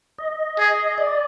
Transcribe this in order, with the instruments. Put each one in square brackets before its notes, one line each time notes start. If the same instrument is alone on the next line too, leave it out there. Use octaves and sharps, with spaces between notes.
[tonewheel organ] D#5
[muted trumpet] G#4
[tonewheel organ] D5